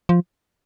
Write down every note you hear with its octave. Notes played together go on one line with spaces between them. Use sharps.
F3